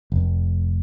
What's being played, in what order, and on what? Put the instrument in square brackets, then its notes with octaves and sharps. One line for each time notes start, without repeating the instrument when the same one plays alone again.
[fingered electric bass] F1